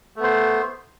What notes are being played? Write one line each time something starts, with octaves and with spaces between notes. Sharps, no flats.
A3 B3 C5